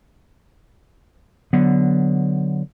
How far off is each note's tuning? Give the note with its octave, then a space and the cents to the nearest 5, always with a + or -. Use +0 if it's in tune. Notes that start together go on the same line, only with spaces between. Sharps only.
D3 +0 F#3 +0 B3 +0